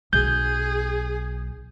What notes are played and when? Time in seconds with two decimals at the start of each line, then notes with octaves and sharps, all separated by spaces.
0.13 B1 G#4 G6